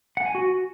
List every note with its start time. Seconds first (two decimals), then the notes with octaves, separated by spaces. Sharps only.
0.17 F#5
0.26 G#5
0.35 F#4